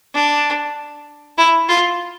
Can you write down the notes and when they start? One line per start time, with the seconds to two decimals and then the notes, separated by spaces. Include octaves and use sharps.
0.14 D4
1.38 E4
1.68 F4